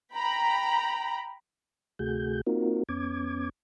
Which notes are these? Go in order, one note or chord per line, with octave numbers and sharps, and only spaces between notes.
G5 A#5 B5
D2 C3 A3 F#4 G#4 G6
A#3 C4 D#4 F4 F#4 A#4
F2 B3 C#4 D6 G#6